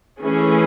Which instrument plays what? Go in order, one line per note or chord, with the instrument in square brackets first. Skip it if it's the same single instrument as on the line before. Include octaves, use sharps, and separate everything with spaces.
[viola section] E3 A3 C#4 G#4